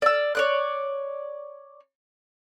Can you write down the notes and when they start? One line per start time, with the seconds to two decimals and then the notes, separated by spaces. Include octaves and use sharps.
0.02 D5 E6
0.35 C#5 D5 F#6